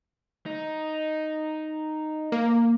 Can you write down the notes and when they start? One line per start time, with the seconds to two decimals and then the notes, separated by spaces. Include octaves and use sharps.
0.46 D#4
2.32 A#3